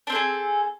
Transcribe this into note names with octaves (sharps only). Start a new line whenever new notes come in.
C4 D4 G#4 A4